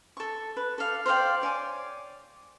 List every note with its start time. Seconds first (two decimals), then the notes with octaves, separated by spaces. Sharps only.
0.17 A4 C#6
0.57 B4
0.78 A4 D5 F5
1.06 C5 D5 F5 G5
1.42 C#5 D5 G#5 D6